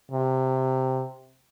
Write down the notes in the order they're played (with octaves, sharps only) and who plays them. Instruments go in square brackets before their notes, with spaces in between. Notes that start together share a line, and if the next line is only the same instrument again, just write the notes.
[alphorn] C3